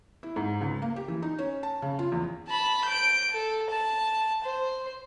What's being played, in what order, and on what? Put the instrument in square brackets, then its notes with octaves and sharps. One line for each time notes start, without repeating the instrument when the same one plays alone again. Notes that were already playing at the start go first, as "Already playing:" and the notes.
[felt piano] E4
G#2
C#2
A#3
G4
E3
D#4
C#4
A5
C#3
F4
E2
[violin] A5 B5
G6 D7
A4
A5
C5